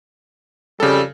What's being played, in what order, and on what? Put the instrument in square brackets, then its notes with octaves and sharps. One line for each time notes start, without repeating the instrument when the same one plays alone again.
[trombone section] F2 G3 [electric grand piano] C#3 A4